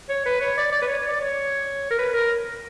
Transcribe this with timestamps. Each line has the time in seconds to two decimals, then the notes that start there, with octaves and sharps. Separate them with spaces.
0.09 C#5
0.26 B4
0.41 C#5
0.57 D5
0.72 D5
0.82 B4
0.88 C#5
1.08 D5
1.20 C#5
1.90 A#4
1.99 B4
2.14 A#4